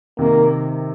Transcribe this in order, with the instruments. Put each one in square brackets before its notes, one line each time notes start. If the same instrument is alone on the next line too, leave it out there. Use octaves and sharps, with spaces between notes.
[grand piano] C3 D#3 [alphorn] A#3